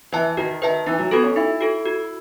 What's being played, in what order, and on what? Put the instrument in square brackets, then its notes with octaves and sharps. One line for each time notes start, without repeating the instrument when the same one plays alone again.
[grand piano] E3 [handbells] B4 E5 A5
[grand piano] D#3 [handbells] F#4
[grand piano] D#3 [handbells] B4 E5 A5
[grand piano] E3 [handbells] D#4
[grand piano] F#3
[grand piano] B3 [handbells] F#4 A4
[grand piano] C#4
[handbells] D#4 [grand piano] E4
[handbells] F#4 A4
F#4